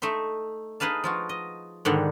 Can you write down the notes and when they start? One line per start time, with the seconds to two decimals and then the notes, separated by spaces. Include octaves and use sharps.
0.02 A3 D#4 E5 C6
0.80 D#4 G#4 B4 F5 A5
1.04 F3 F4 F#4
1.29 D#5
1.85 G#2 D3 D#3 G3